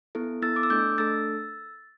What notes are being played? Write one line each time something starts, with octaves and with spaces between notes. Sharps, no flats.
B3 E4 A4
B3 E4 A4 E6 A6
D6
E6
A3 D4 A4 D6 G6
A3 D4 A4 E6 A6